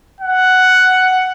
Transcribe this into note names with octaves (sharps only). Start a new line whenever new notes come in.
F#5